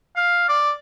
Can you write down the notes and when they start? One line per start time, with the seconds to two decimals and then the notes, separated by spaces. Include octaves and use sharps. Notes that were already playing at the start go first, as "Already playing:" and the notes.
0.16 F5
0.49 D5